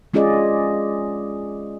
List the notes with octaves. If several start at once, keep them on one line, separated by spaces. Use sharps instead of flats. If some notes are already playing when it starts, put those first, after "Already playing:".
G#3 C#4 F4 G#4 D5 D#5